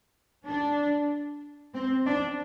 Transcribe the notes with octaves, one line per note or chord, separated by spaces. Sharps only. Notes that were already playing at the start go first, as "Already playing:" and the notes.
D4
C4
D4